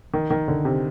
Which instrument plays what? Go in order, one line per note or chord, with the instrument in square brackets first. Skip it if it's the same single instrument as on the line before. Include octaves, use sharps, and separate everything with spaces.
[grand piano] D#3
D#3
D3
C3